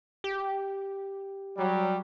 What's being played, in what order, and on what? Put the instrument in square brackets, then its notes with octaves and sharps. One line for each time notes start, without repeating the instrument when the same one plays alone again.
[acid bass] G4
[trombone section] F#3 G3